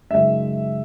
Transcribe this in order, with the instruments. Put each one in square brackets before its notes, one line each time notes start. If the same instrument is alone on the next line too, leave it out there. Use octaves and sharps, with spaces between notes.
[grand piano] F#2 C#3 G#3 D#4 E5